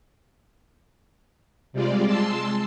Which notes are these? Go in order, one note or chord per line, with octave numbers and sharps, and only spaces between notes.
C3 G3 G#3 F4 D5
G#3 A5 C6 E6